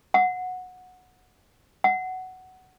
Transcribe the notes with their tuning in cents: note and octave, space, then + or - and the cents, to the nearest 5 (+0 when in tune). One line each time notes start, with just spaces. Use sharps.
F#5 -15
F#5 +10